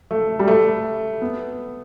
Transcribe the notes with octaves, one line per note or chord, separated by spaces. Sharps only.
A3
G3
A3
B3